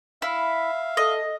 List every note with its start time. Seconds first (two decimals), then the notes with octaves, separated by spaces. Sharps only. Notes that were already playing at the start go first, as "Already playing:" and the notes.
0.22 E4 E5 F5
0.97 A4 D#5